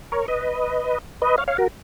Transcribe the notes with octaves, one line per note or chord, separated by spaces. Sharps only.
A#4 C#5
B4 D#5
B4 D#5
C#5 F5
C#5 F5
F#4 A#4